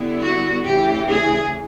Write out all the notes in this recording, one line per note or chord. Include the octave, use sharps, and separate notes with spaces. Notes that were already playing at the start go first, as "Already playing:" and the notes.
Already playing: D3 G3 B3 E4
F#4
D2 C#3 E3 G4
G#4